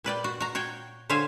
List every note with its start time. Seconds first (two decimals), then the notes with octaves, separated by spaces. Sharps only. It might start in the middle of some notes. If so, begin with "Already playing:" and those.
0.04 A#2 B4 D5 G5
0.24 F#4
0.40 F#4 A#5
0.55 F#4 C#5 G5
1.10 D3 C5 C#5 E5 F5 G#5